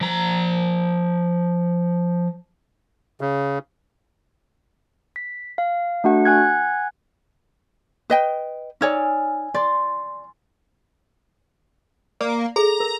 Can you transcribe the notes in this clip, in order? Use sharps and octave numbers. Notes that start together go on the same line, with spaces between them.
F3 A#5
C#3
B6
F5
A3 D4 F#4 F#5
F#5 G#5 F#6 G#6
B4 D#5 G5
D#4 C#5 D5 G#5 E6 F6
D5 C6 A6
A#3 D5
G#4 A4 A#5
A#4